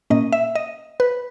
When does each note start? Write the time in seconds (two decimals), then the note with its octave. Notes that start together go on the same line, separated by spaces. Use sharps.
0.10 A#2 A#3 C#4 D#5
0.33 E5
0.55 D#5
1.00 B4